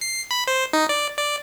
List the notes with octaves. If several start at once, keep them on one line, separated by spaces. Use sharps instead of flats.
C7
B5
C5
D#4
D5
D5